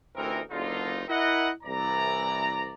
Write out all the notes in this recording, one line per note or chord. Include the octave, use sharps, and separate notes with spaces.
A1 D2 E3 C4 D#4 A#4
F#1 D3 D#4 F4
E4 A#4 D#5 F#5
C2 E3 D5 A#5